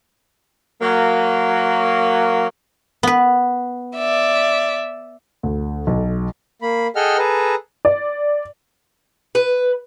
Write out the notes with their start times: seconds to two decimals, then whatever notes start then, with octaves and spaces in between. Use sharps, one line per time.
0.81 F#3 A#3
3.03 B3 B4
3.96 D5 E5
5.43 D2
5.87 B1
6.62 A#3 B5
6.96 G#4 A4 D#5 F#5 G5 F6
7.18 G#4 A4 B4 A#5
7.85 D5
9.35 B4